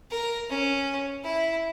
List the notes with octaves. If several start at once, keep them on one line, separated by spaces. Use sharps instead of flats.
A#4
C#4
E4